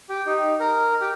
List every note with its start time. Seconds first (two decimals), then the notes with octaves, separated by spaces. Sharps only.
0.10 G4
0.27 D#4
0.60 A#4
1.01 G4